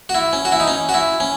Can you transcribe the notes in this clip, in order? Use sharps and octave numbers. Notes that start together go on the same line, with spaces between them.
F#4
E4
C#4
F#4
E4
D#4
C#4
F#4
E4
C#4